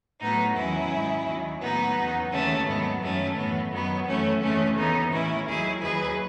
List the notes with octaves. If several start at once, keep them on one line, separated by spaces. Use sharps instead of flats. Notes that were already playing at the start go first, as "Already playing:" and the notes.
A2 F#3 B3 D#4
E2 D#3 F#3 C#4 E4
G#2 D#3 F#3
D#2 D#3 F#3
A2 F#3 B3 D#4
E2 C#3 F#3
D#2 C#3 E3 A3 C#4
G#2 D#3 F#3 B3
F#2 D#3 F#3 A3 C#4
A2 E3 B3
F#2 D#3 F#3 B3
F#2 E3 A3 C#4
D#2 C#3 E3 A3 C#4
D#2 C#3 E3 B3 D#4
A2 E3 C#4 E4
D#2 D#3 F#3 E4 G#4
D#2 D#3 F#3 G#4 B4